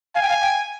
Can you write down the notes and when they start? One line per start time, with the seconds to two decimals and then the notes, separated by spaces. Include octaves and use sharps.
0.15 F5 G#5
0.22 G5
0.29 F5
0.41 G5